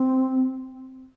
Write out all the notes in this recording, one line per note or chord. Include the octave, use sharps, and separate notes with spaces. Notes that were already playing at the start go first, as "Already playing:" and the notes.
Already playing: C4